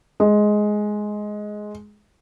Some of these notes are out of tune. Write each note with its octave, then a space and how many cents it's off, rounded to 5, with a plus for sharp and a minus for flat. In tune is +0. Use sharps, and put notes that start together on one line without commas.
G#3 +10